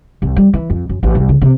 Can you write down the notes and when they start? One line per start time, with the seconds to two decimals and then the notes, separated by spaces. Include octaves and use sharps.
0.22 C2
0.36 G3
0.54 E3
0.70 F2
0.89 F#2
1.03 A1
1.15 C2
1.29 C#3
1.42 C3